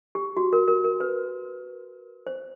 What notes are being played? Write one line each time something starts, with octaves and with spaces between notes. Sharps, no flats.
G4
F#4
A#4
A#4
A#4
B4
C5